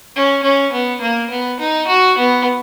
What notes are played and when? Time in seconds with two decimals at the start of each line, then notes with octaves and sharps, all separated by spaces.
0.15 C#4
0.43 C#4
0.72 B3
1.01 A#3
1.30 B3
1.60 D#4
1.87 F#4
2.18 B3